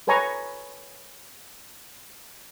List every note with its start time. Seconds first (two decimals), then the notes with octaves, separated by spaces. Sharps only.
0.07 A4 B4 C#5 G#5 A#5 C#6